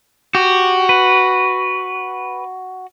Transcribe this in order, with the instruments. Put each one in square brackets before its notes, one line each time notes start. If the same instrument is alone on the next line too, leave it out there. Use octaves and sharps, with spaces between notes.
[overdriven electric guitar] F#4 [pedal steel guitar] G4
[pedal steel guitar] B4